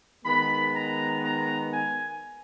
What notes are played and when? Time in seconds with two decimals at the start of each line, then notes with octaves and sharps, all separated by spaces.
0.24 D#3 G#3 B3 B5
0.75 A#5
1.24 A#5
1.73 G#5